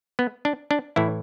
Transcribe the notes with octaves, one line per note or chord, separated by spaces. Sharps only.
B3
D4
D4
A2 E3 E4